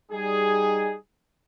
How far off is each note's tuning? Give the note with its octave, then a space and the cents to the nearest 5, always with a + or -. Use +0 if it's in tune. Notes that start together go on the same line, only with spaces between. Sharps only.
G3 +0 D#4 -5 G#4 +0